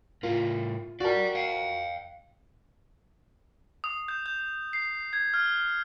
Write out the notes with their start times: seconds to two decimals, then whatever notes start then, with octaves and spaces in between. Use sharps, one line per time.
0.23 A2 F4 A#4
1.00 F#4 A#4 D5 G5
1.35 F5 G5
3.84 D#6
4.08 G6
4.26 G6
4.73 C7
5.13 G#6
5.34 F6